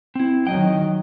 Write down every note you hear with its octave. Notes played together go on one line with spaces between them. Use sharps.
C4 E4
D#3 F#3 D#5 G5